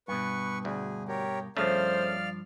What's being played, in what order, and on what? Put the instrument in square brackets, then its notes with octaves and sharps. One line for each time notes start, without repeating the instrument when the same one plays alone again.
[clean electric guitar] G2 B2 [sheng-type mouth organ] B4 C#6
[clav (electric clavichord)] D2 [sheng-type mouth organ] G#4
[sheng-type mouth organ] G4 A#4 C#5
[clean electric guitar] G2 F3 [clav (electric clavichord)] C#3 A3 [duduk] C5 [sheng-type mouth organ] D5 F5 F6